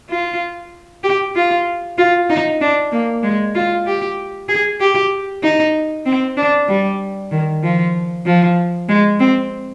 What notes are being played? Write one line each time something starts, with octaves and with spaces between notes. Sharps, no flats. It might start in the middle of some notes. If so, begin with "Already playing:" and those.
F4
G4
F4
F4
D#4
D4
A#3
G#3
F4
G4
G#4
G4
D#4
C4
D4
G3
D#3
F3
F3
G#3
C4